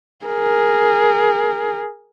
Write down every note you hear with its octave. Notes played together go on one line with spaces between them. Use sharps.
G#4 A#4